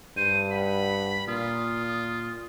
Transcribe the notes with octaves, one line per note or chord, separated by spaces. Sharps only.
G2 C5 D#7
F#5 B5
A#2 F4 D#6